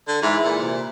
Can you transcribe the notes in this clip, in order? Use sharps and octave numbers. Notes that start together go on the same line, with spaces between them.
D3
G#2 E3 E4
A#2
C3